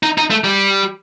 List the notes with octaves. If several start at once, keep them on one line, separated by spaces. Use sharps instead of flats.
D#4
D#4
A3
G3